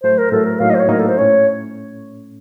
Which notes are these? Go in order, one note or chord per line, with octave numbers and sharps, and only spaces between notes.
A2 F#3 A3 C5
A#4
A2 F#3 A3 A4
A#4
A2 F#3 A#3 D#4 F5
D#5
C5
C#5
A2 F#3 A#3 D#4 A#4
A4
C5
A2 A3 C#4 C#5